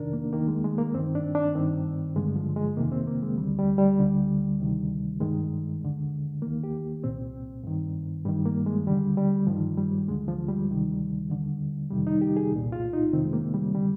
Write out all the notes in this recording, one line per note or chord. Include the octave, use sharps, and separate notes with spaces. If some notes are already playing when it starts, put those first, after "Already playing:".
Already playing: F2 C3 D#3 D4 A#4
A#3
D#2 D#3 A#3
G#3
G#3
A#3
G2 D#3 C4
D4
D4
G2 D#3 C4
G2 D3 G#3
F3
G#3
F2 C3 D#3 A#3
C4
A#3
G#3
D2 D3 G3
G3
G3
D2 D3
D2 C3 D#3
G2 D#3 G#3
D#2 D3
D#2 D#3 A#3
G4
C2 A#2 C4
G2 D#3
G2 D#3 G3
A#3
G#3
D#2 D3 G3
G3
G2 D#3 F3
G3
D2 D3 G#3
F3
G3
D2 C3 D#3
D#2 D3
F2 C3 D#3 G3
D#4
G4
G#4
C2 A#2
F4
D#4
F2 C3 D#3 C4
G#3
A#3
G3
D3 G3